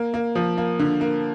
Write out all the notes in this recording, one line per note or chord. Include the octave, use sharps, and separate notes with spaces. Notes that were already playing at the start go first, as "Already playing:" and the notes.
Already playing: A#3
A#3
F3
A#3
D3
A#3